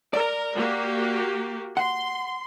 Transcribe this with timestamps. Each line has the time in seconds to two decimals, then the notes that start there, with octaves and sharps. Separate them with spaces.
0.14 A#4 D5
0.56 A#3 F#4 G4
1.77 F#5 C6